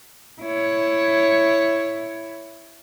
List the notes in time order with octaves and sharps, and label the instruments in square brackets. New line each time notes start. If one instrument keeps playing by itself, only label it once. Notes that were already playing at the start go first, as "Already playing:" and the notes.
[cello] E4 C#5